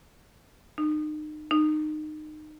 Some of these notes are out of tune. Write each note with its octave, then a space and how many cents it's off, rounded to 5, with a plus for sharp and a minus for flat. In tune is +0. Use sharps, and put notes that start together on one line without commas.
D#4 -35
D#4 -25